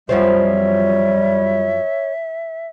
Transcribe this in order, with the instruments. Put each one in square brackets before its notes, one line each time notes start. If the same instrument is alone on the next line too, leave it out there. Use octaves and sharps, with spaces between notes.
[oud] F#2 F3 C4 [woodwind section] G3 [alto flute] C#5 [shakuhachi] E5